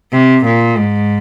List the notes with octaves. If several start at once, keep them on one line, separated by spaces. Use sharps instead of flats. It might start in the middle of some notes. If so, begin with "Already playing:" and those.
C3
A#2
G#2